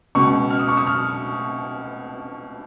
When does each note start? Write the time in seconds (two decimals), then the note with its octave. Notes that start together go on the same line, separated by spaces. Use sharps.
0.15 C#2 B2 C#6
0.50 F6
0.59 D#6
0.68 C#6
0.77 D#6
0.87 F6